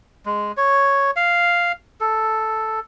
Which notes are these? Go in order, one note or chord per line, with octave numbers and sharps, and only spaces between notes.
G#3
C#5
F5
A4